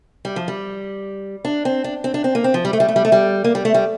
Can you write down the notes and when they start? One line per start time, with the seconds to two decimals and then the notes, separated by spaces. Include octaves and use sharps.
0.25 G3
0.36 F3
0.48 G3
1.45 D4
1.65 C4
1.84 D4
2.04 C4
2.14 D4
2.24 C4
2.35 A#3
2.44 C4
2.54 F3
2.65 G3
2.73 A3
2.80 G3
2.88 A3
2.96 G3
3.05 A3
3.12 G3
3.44 A#3
3.55 G3
3.65 A3
3.74 G3